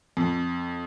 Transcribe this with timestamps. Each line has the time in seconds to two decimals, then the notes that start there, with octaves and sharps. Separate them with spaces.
0.17 F2